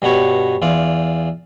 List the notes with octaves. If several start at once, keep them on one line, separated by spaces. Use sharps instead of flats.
G2 B2 B3 C#5
E2 F4 D5